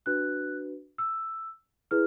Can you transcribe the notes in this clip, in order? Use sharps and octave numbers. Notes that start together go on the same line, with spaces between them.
D4 F#4 B4 F#6
E6
E4 G#4 B4 F6